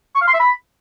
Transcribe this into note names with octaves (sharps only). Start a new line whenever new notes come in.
C#6
F5
C6
E5
B5